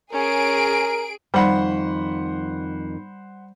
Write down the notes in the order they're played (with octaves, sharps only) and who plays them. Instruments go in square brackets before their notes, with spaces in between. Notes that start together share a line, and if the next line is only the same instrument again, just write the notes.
[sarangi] C#4 [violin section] G#4 D7 [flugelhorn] A#4
[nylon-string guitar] F2 D#3 [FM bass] G3 [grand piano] C5 F#5 B5